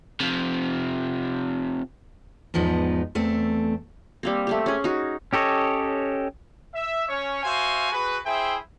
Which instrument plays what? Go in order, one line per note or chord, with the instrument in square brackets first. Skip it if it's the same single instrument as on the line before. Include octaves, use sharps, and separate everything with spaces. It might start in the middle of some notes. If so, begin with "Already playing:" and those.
[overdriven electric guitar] C3 F3
[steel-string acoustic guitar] E2 G#2 F3 B3 D#4
E2 A3 C4
[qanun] G3 A#3 C4
A3 C4 G4
C#4 G#4
D#4 F#4
[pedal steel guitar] C#4 G4 A4 C#5 D#5
[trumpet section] E5
C#4 C#5
F#4 C5 E5 F5 G#5
F#4 G#4 B4
E4 G#4 C5 E5 G5